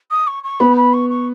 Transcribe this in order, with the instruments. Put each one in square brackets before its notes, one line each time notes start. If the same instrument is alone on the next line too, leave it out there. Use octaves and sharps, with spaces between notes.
[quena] D#6
C#6
C#6
[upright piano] B3 [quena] B5
[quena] B5
C#6
C#6